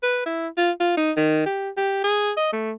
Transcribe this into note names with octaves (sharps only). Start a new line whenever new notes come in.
B4
E4
F4
F4
D#4
D#3
G4
G4
G#4
D#5
A3